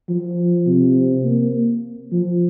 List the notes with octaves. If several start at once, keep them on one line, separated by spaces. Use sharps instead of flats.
F3
C3
A#3
F3